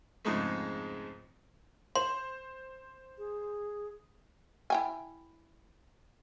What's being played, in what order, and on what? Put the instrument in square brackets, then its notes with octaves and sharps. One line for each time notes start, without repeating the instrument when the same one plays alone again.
[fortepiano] F2 G#2 C#3 F3 G#3 A3
[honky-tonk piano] C5 [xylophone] C6
[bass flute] G#4
[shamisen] E4 G5 G#5